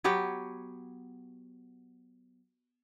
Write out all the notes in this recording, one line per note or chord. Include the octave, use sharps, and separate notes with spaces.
F#3 B3 G4 C#5